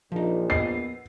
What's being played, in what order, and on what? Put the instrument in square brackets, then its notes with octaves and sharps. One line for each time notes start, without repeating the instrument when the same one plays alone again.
[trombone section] A#1 [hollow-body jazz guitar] F3 D#4
[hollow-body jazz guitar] B3 D#5 [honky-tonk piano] C7